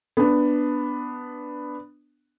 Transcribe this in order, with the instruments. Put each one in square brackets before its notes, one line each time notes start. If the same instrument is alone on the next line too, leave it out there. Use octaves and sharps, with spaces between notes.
[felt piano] B3 D4